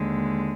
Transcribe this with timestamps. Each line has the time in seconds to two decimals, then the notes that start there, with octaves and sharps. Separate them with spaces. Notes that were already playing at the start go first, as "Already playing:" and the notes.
Already playing: D#2 D3 G#3